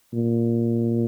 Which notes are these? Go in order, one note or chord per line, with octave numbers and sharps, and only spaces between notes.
A#2